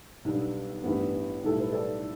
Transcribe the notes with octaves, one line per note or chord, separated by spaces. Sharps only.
B1 B2 G3 B3 D4
A1 G2 G3 B3
B1 A2 G3 E4 A4
B4
A4 D5